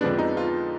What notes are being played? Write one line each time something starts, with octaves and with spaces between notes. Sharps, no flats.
F2 D3 F3 G#3 B3 D4
D#4
F4